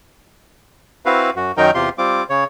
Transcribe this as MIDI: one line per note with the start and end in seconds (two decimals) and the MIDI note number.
1.06 1.31 60
1.06 1.31 64
1.06 1.31 66
1.06 1.31 71
1.06 1.31 77
1.36 1.52 42
1.36 1.52 66
1.57 1.71 42
1.57 1.71 51
1.57 1.71 54
1.57 1.71 63
1.57 1.71 70
1.57 1.71 79
1.75 1.89 40
1.75 1.89 48
1.75 1.89 65
1.75 1.89 67
1.75 1.89 84
1.98 2.24 55
1.98 2.24 60
1.98 2.24 65
1.98 2.24 86
2.29 2.44 49
2.29 2.44 73